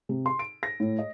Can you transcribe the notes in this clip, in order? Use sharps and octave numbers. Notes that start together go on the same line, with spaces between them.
C3
C6
D7
A#6
A2
D#5